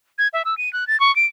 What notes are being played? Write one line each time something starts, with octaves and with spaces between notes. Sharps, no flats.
G#6
E5
E6
D#7
F#6
A6
C#6
D7